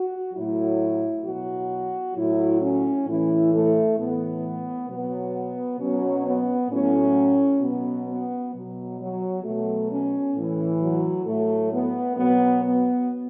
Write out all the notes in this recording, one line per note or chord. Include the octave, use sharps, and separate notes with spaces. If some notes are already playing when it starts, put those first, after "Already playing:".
Already playing: F#4
A2 F#3 E4
B2 F#3 F#4
A2 F#3 E4
C#4
A2 E3 E4
A3
A2 E3 B3
B2 F#3 B3
B2 F#3 C#4
B3
A2 F#3 C#4
B2 F#3 B3
B3
B2 F#3
F#3
B2 F#3 A3
C#4
A2 E3
F#3
A2 F#3 A3
B3
B2 F#3 B3
B3